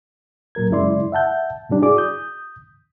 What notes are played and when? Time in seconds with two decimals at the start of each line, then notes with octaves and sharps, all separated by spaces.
0.55 A#2 F#3 A#4 G#6
0.70 F#2 C#3 G#3 E4 D5 C6
1.12 E5 F#5 A5 G6
1.69 G#2 C3 G3 D4
1.82 E4 F#4 G#4 D5 D6
1.97 D#6 G6